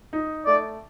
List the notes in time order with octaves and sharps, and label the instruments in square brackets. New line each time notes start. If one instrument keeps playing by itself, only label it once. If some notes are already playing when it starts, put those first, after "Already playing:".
[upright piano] D#4
[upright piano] A3 [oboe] D5